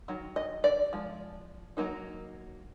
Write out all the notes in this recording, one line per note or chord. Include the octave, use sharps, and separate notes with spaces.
D#3 F#3
D#5
D5
F3 G#3
F#3 A#3 D#4